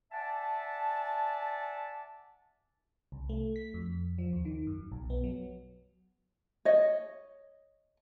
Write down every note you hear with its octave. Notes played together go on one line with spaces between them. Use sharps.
D5 E5 F#5 G#5 A5
C2
A3
B6
F2
F3
D#2
D#3
F#2
B1
B3
F#3
C#5 D#5